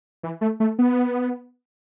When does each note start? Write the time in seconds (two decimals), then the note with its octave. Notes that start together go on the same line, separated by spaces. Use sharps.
0.23 E3
0.41 A3
0.60 A3
0.79 B3